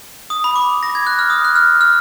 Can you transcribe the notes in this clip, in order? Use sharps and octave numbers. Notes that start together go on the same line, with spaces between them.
D#6
B5
D6
A#6
G#6
F#6
F6
D#6
F#6
F6
F6